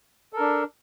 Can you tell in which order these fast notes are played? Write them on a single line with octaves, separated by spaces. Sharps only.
A4 A#4 D4